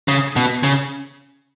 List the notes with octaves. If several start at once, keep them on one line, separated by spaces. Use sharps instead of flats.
C#3
B2
C#3